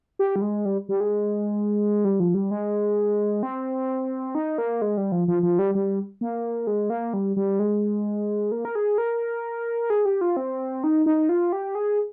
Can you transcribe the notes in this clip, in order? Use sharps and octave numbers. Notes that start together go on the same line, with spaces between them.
G4
G3
G#3
G3
G3
G#3
G3
F3
G3
G#3
C4
D#4
A#3
G#3
G3
F3
F3
F3
G3
G3
A#3
G#3
A#3
G3
G3
G#3
A#3
A#4
G#4
A#4
G#4
G4
F4
C4
D#4
D#4
F4
G4
G#4